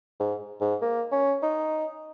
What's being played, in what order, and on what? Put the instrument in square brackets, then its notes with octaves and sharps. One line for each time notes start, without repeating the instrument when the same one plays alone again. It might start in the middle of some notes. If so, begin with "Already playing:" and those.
[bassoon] G#2
G#2
A#3
C#4
D#4